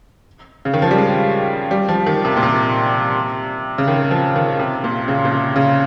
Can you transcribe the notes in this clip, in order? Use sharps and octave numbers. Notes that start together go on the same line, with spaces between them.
C#3
D#3
F3
G3
G#3
G3
F3
D#3
C3
A#2
C3
C#3
D#3
F3
D#3
C3
A#2
C#3
A#2
C3
C#3